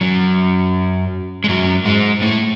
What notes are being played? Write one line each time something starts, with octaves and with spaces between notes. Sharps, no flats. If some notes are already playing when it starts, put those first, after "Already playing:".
F#2 F#3
G#3
F#2 F#3
G#2 G#3
A2 A3